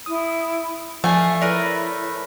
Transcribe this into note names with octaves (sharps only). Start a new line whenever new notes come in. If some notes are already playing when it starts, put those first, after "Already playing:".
E4 D#6
F3 A3 D5 F5 G#5
E4 A#4 B4 C#5 D5